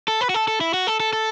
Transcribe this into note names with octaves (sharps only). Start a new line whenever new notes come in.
A4
B4
F#4
A4
A4
E4
F#4
A4
A4
A4